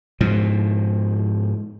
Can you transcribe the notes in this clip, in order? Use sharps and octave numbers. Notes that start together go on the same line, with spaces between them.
G#2 B2 F3